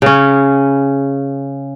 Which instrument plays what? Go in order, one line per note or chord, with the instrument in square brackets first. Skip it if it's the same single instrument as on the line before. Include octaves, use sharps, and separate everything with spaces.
[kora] C#3 C#4